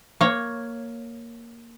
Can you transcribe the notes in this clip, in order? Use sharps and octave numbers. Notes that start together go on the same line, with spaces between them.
A#3 C#5